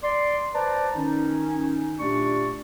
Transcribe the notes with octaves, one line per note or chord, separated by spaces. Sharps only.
D5 C6
B4 C5 D5 A5 A#5
D#3 C#4 D#4
A#2 A3 D4 G4 D5 C#6